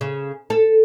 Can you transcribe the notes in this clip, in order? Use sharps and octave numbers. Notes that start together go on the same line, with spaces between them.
C#3
A4